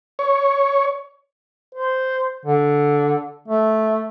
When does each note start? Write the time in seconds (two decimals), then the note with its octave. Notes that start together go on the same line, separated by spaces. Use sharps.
0.19 C#5
1.75 C5
2.45 D3
3.48 A3